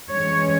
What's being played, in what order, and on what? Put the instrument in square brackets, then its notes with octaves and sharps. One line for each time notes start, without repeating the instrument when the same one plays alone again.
[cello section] E3 G#3 C#4 C#5